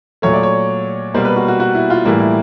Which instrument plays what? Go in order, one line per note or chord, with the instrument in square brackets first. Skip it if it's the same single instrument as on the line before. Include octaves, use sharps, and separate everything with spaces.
[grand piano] A#2 F#3 A3 C#5
D5
C#5
B2 G3 A#3 C5
B4
F#4
F#4
F#4
E4
F4
A2 E3 G3 A#3
E4